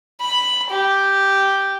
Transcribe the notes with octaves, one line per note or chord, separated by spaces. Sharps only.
B5
G4